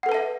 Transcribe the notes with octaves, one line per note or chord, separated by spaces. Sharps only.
A4 B4 E5 F#5 A5